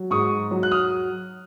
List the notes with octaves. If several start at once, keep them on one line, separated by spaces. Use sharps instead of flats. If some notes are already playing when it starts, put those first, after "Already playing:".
Already playing: F#3
G#2 C#6 D#6
F#3
F#6
D#6 F6